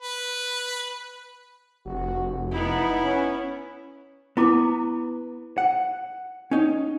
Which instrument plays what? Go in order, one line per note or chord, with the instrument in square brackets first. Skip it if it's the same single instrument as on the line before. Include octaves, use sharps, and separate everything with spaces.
[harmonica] B4
[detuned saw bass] F1 [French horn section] F#4
[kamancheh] B3 E4 [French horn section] D#4
[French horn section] C#4
[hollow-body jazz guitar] B3 B4 [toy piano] E4 A#5 D6
[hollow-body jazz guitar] F#5
C#4 D#4 C#5